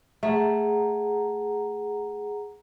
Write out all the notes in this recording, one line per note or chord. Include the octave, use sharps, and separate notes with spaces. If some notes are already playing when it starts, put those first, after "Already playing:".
A3 G#4 F#5 A#5